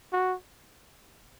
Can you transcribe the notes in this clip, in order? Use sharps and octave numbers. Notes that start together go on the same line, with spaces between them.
F#4